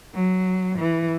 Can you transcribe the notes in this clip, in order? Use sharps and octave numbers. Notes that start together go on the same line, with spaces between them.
F#3
E3